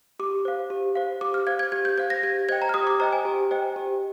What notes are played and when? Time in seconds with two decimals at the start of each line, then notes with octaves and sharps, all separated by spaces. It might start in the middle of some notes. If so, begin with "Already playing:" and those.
0.20 G4 D6
0.45 C5 F5
0.70 G4
0.95 C5 F5
1.21 G4 D6
1.34 F6
1.47 C5 F5 G#6
1.59 G#6
1.72 G4 G#6
1.85 G6
1.98 C5 F5 G#6
2.10 A#6
2.23 G4 G#6
2.49 C5 D#5 G5 G#6
2.62 A#5
2.69 F6
2.74 G4 D#6
2.87 D6
3.00 C5 D#5 G5 A#5
3.13 G#5
3.25 G4
3.51 C5 D#5 G5
3.76 G4